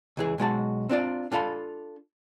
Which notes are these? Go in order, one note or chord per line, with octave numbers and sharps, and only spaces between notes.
C#2 E3 G#4
B1 G#3 F#4 A5
C4 D4 F4 D5
D4 F4 A4 F5 B5